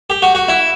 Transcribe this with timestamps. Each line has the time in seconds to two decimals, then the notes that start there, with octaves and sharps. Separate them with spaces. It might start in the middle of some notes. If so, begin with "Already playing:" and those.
0.10 G4
0.22 F#4
0.35 F#4
0.48 E4